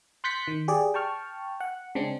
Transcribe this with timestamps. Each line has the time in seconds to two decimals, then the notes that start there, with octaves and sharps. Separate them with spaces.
0.24 C6 F#6 G6 A6 B6 C#7
0.48 D#3
0.68 G4 G#4 D5
0.94 G5 A5 C#6 F6
1.60 F#5
1.95 C#3 G#3 C4 D4